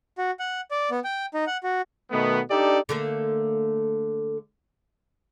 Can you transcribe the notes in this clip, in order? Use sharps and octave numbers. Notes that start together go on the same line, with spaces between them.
F#4
F#5
D5
B3
G5
D#4
F#5
F#4
B2 D#3 A3 B3
D4 D#4 G4 A4 D5
D3 A3 A#3